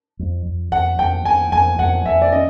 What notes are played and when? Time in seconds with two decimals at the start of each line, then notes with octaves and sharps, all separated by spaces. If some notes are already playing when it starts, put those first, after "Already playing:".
0.19 F2
0.46 F2
0.72 F2 F#5
0.99 F2 G5
1.25 F2 G#5
1.52 F2 G#5
1.79 F2 F#5
2.06 F2 E5
2.22 D5
2.32 C#4 D#5